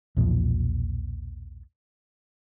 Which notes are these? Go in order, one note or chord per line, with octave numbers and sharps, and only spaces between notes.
B1 E2 A#2 F3